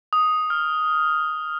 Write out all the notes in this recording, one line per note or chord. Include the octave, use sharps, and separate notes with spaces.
D#6
F6